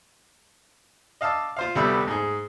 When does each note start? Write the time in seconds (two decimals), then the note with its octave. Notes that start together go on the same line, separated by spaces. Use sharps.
1.21 D#5 F5 A5 D6 E6
1.57 F4 C5 F5
1.75 D2 C3 G3 A3 B3 E6
2.08 G#2 G#4